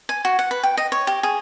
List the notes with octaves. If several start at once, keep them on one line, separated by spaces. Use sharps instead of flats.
G#5
F#4
F#5
B4
G5
D#5
C#5
G4
G#4